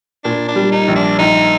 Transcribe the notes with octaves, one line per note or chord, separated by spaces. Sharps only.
A#2 D4
D4
G3
D#4
A#1
D4
A#1 D#4